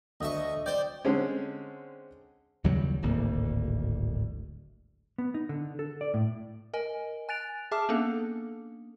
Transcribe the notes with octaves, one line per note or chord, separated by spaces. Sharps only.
D2 D#5 E5 C#6
C5 D5 G5
D3 G#3 C4 C#4
D#2 C#3 F#3 G3
D1 G#1 D2 A#3
B3
D#4
D3
A4
D5
A2
A#4 D#5 G#5
G#5 F#6 A6 D7 F7
G#4 E5 A5 D6 F6
A#3 B3 C#4 D4 A4